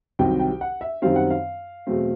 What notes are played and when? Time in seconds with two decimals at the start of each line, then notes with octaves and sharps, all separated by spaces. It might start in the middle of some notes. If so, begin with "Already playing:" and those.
0.19 C2 C3 D#3 F#3 G5
0.39 G5
0.61 F#5
0.81 E5
1.02 F#2 D#3 G3 C4 F5
1.16 F#5
1.30 F5
1.87 E2 B2 F#3 A3 C4